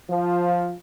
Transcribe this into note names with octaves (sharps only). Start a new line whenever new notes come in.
F3